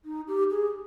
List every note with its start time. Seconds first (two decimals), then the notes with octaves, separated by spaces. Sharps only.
0.05 D#4
0.28 G4
0.51 G#4